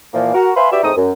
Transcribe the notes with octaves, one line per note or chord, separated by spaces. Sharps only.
A#2 E3 F3 A#3
F#4 A#4
B4 E5 F5 G#5 B5 C6
F#4 G4 B4 D5 E5
E2 G#2 A3 C4 D#4 D#6
F#2